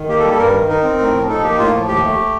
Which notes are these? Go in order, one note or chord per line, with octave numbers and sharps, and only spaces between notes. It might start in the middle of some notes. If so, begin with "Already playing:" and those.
Already playing: D#3
A#3 G4
A4
G3 G4
A4
G2 A#4
D#3
D#4 A#4
C4
A2
F3
D#4 A4
A#3 G4
A2 F4
F3
D#2 G4
A3